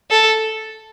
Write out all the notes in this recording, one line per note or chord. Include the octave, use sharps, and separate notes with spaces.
A4